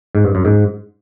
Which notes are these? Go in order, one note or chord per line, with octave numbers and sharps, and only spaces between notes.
G#2
G2
F#2
G#2